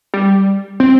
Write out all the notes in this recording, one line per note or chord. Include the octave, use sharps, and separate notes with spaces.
G3
C4